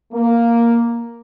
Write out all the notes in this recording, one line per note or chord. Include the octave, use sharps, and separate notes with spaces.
A#3